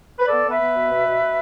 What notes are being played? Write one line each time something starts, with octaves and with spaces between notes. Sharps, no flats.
B4
B3 A4 D5
B3
B4 E5
B3
B2
B2
B2
B2